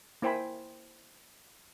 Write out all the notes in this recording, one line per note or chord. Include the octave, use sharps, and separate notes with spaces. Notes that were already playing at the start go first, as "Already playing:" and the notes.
A#3 E4 C5 G5 G#5 B5